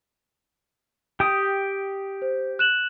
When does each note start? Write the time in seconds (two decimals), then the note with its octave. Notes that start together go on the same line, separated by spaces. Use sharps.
1.20 G4 G5 D#6
2.22 C5
2.59 F#6 E7 F#7